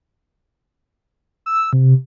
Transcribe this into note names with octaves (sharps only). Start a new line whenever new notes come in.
E6
C3